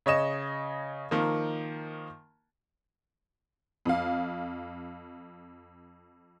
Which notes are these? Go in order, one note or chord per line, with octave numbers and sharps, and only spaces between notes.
C#3 C#5 D#5 E7
D#3 F3 A#3
F2 F5